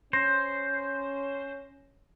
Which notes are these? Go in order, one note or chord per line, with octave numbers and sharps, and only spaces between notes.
C#4 C5 A#6